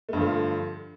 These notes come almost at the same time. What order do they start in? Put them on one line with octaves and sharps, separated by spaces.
A3 G2 F3 D3